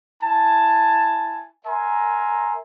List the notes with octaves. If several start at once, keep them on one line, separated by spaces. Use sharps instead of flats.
E4 G#5 A5
A#4 E5 G#5 A#5 C6